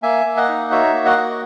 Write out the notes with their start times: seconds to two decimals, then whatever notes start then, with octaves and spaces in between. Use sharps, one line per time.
0.03 A#3 E5 G#5
0.25 A#3
0.37 D#5 F#5
0.49 D#4
0.71 F#4 C#5 E5
0.93 A#3
1.05 D#5 F#5
1.17 F#4